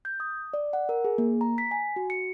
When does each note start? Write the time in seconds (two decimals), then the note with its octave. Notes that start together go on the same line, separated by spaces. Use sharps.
0.05 G6
0.20 D#6
0.54 D5
0.73 F#5
0.89 A#4
1.04 G#4
1.18 A#3
1.41 A#5
1.58 B6
1.71 G#5
1.96 F#4
2.10 C#7